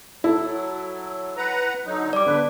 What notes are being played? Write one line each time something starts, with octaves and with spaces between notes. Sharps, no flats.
F#3 E4 A4
B4 F#5 A#5
D3 F#3 D#4
G3 D5 D6
D3 B3 B4